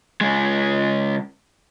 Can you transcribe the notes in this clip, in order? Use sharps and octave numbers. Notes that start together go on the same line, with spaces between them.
C#3 G#3